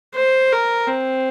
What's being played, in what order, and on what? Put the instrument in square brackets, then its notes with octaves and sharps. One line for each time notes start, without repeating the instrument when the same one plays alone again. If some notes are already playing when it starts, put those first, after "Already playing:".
[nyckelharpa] C5
A#4
C4